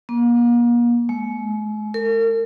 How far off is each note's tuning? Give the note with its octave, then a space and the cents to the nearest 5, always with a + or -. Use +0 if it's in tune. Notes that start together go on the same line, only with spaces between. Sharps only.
A#3 +40
G#3 +40
A#4 -40